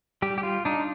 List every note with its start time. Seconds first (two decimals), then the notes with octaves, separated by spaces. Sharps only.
0.22 G3 G4
0.38 G4
0.43 F4
0.65 D4 D#4